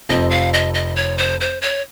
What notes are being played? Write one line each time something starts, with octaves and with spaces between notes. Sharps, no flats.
F1 F2 C3 F3 C4 D#5
F5
D#5
D#5
C#5
C5
C5
C#5